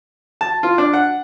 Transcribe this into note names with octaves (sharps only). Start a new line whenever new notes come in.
A5
F4
D4
F#5